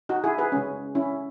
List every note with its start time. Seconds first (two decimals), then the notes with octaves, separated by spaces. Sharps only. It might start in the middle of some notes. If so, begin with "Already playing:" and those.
0.09 D#4 F#4
0.24 E4 G#4
0.38 G#4 B4
0.52 C#3 G#3 C#4
0.95 C#4 E4